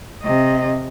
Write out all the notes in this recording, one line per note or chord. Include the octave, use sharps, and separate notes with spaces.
C3 D#5